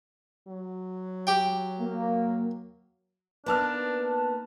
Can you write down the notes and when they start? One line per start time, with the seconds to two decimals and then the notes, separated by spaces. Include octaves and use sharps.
0.48 F#3
1.27 G4 G5
1.80 A#3
3.46 A#3 B3 D4 D#4 B4 A5 F6